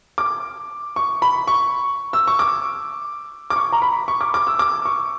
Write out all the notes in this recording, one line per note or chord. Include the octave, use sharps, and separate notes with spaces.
D6
C#6
B5
C#6
E6
C#6
D6
D6
C#6
A#5
B5
C#6
D6
D6
E6
D6
C#6